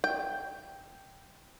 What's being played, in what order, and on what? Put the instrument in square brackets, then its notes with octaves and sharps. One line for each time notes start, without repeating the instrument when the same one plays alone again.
[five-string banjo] G5